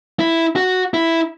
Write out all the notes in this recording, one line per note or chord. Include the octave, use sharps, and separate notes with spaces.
E4
F#4
E4